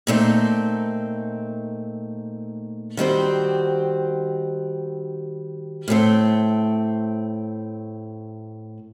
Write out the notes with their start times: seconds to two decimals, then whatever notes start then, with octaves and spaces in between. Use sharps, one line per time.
0.07 A#2 A3 C4 D#4
2.97 D#3 G3 C4 F#4 C5
5.88 A2 A3 C4